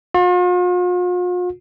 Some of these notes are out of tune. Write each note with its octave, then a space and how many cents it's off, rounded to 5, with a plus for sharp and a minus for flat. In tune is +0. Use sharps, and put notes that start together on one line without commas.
F4 +45